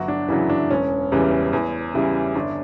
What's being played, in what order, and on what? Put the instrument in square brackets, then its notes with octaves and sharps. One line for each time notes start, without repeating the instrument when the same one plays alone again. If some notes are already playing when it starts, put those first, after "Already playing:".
Already playing: [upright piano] G1 F#3 F#4
D4
F#2 C#3 E3 F#3 E4
D4
E1 C#4
E2 C#3 E3 G3
E2
C#3 E3 G3
G1 D4